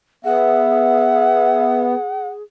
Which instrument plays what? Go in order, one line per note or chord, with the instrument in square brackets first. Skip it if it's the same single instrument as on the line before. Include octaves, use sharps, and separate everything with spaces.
[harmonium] B3 [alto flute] G#4 [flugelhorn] E5 [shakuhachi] F#5